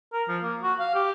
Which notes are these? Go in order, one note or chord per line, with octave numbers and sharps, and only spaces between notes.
A#4
F3
A#3
F#4
F5
G4